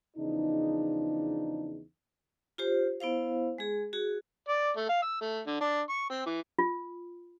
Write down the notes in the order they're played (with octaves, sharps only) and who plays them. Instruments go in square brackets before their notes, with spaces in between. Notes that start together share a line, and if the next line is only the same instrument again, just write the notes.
[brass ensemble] E2 C#3 F3 D4 D#4
[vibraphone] F4 G4 C5
B3 E4 C5 F5
G#3 G#4
F#4 G#4
[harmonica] D5
A3
F5
E6
A3
D3
D4
C#6
C4
E3
[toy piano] F4